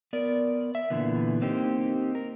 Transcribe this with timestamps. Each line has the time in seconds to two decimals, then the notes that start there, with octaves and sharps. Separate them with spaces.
0.13 B3 A#4 D5
0.75 E5
0.90 A#2 D3 E3 B3
1.42 A#3 C4 D#4 G4
2.15 A#4